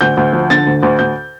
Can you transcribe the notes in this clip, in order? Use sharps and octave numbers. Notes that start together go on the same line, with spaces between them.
D2 G6
D2
F3
D3 A6
D2
D2
D2 G6